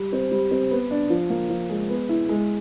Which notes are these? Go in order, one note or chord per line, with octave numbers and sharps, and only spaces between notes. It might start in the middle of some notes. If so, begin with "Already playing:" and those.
Already playing: G3
C4
G3
C4
B3
D4
F3
A#3
F3
G#3
B3
E4
G#3